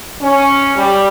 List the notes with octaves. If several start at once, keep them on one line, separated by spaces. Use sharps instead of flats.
C#4
G3